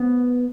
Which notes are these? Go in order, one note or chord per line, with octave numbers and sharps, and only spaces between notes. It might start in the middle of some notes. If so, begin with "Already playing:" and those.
Already playing: B3